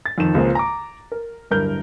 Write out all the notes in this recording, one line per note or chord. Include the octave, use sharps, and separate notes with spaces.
A6
F2 D#3 E7
C#2 F3 G#3 A#3 C4
A#5 D6
A#4
D1 G2 A#4 G6